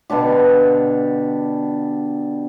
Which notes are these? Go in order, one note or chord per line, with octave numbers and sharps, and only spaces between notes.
B2 D3 D4 G4